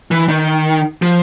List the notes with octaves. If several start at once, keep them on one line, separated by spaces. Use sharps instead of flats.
E3
D#3
F3